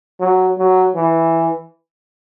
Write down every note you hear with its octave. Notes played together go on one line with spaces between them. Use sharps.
F#3
F#3
E3